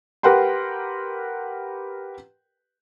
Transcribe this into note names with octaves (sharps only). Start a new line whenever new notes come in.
G4 A#4 B4 F#5 G5 C6